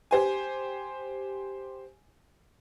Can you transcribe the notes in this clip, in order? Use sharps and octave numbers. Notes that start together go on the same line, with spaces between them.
G4 C5 G#5